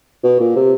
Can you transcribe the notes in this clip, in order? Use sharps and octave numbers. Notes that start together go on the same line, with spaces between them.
B2
A#2
C3